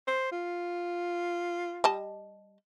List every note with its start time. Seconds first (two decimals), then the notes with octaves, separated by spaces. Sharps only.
0.07 C5
0.32 F4
1.84 G3 D#5 A5